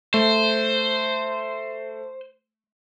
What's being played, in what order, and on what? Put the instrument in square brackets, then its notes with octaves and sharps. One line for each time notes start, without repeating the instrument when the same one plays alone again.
[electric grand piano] A3 [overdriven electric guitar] C5